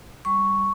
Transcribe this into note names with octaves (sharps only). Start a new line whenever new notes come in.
G3 C#6